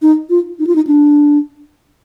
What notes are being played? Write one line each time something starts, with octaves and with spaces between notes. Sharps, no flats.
D#4
F4
D#4
F4
D#4
D4